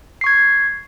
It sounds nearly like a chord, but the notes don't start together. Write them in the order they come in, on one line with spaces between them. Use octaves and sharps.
C7 C#6 G#6